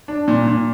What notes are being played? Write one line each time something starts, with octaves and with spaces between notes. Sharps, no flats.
D4
A#2
A#2